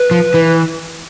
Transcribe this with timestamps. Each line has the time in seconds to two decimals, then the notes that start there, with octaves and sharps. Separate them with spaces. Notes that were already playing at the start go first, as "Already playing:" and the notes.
Already playing: B4
0.11 F3
0.34 E3